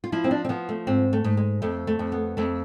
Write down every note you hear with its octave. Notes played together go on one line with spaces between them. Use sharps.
F4
F3 E4
C4
D4
C4
F3 B3
A3
G#2 C4
A3
G#2
G#3
F2 A3
A3
F2
B3
F2 A3